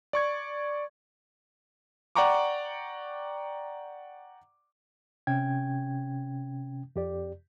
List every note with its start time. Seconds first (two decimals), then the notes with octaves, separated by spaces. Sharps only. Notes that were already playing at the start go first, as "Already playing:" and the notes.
0.13 D5 C#6 G#6
2.15 D5 F#5 G5 A#5 C#6 D6
5.27 C3 C#4 G5 G#6
6.96 F2 G4 D5